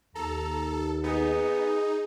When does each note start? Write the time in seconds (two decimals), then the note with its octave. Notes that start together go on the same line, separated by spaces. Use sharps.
0.15 D#2 A4 A#5
1.04 B3 D#4 G#4